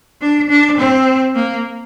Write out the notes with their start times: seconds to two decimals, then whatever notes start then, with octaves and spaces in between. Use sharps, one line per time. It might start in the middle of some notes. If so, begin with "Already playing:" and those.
0.21 D4
0.49 D4
0.78 C4
1.35 A#3